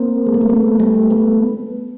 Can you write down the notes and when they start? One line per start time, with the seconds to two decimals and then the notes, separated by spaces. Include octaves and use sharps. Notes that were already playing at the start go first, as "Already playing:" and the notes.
Already playing: A#3 C4
0.27 G#3
0.34 A3
0.41 A#3
0.50 A3 B3
0.80 G3 A3
1.11 A3 B3